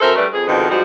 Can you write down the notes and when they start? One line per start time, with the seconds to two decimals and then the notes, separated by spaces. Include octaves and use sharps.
0.01 F#2 A4 A#4 C5 E5
0.16 G3 A3 D4 B4
0.32 F2 G#4
0.47 F2 G#2 B2 D3 D#3
0.69 G#2 D#3 F3 G3 F#4